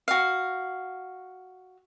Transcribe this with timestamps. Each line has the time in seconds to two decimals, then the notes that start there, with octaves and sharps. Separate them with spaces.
0.08 F#4 F5